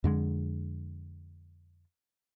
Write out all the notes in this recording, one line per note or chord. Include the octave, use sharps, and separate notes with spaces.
F2 D3 G#3